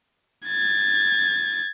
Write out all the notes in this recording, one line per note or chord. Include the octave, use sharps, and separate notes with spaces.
G#6 A6